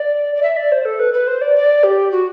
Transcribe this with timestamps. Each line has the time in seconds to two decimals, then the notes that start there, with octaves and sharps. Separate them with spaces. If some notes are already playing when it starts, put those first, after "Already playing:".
Already playing: D5
0.36 D5
0.43 E5
0.57 D5
0.72 C5
0.85 A4
0.99 B4
1.14 B4
1.27 C5
1.41 D5
1.56 D5
1.83 G4
2.12 F#4